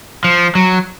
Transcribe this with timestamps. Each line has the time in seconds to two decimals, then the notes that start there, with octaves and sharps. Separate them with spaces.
0.24 F3
0.55 F#3